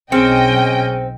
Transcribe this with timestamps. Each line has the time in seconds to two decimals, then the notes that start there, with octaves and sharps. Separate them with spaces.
0.12 B1 C4 C#4 G#4 D#5 G5 F6 C#7